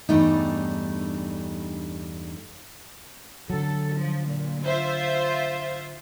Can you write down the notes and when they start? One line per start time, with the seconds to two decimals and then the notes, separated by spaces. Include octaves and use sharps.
0.09 E2 G2 G3 A3 D4 D#4
3.50 D3 F#3 A4
3.96 F3
4.28 A#2
4.65 F4 C5 E5